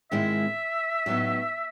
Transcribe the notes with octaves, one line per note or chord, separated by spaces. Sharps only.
G#2 D#3 G#3 C4 E4 E5
A2 F#3 B3 D#4